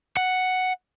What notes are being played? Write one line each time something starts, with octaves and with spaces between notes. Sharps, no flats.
F#5